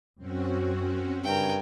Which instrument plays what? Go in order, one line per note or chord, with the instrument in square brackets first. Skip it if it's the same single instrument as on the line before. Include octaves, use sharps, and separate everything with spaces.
[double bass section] F#2 [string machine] C4 C#4 F#4
[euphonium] G2 [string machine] C#3 G#5 [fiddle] A#4 G5